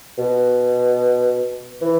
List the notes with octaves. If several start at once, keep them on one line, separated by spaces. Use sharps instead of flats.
B2
E3